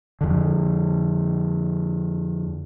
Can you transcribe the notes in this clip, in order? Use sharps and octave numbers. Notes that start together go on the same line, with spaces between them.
F2 D3